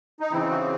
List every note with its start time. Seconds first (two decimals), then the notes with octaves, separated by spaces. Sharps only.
0.20 D#4
0.32 C#3 E3 C4 E4
0.51 F#4